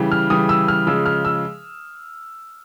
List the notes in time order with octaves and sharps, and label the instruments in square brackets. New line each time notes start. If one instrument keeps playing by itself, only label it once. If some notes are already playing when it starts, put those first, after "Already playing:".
Already playing: [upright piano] C#3 E3 G3
F6
C#3 E3 G3 D#6
E6
F6
C#3 F3 G#3 E6
F6
E6